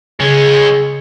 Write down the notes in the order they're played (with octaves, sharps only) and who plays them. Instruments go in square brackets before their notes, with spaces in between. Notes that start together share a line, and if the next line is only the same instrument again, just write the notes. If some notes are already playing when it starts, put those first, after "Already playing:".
[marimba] C#3 [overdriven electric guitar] G#3 C#4 [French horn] G#4